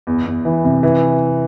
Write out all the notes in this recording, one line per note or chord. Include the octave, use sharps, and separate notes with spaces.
E2
E2
E3
C3
E3